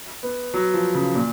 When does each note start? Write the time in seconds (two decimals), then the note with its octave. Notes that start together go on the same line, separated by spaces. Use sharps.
0.23 B3
0.54 F#3
0.73 F3
0.94 C#3
1.15 A#2